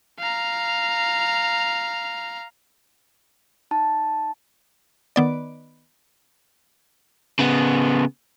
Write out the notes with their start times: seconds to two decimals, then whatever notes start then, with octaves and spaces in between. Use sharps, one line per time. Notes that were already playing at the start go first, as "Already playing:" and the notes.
0.19 F5 A#5
3.71 D#4 A5
5.16 D#3 B3 D5
7.39 C#3 B3